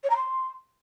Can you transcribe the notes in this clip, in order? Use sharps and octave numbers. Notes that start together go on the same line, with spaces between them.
C#5
A#5
C6